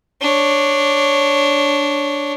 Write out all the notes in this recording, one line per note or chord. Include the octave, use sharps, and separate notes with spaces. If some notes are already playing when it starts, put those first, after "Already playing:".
D4 C#5